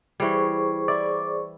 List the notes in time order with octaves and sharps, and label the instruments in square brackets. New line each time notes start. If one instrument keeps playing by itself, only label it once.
[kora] E3 G3 [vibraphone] G#4 C5 C#6
[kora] E4 [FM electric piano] D5